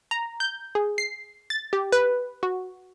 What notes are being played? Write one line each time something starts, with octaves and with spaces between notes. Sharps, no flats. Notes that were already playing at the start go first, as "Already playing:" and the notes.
A#5
G6
G#4
C7
A6
G4
B4
F#4